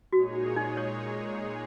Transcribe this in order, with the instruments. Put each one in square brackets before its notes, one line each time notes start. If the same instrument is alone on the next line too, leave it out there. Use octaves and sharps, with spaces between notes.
[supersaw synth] A#2 G#3 D#4 G#4 C#5 [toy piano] F#4
[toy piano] D#4
C#5